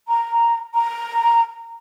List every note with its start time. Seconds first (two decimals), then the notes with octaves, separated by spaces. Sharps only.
0.08 A#5
0.75 A#5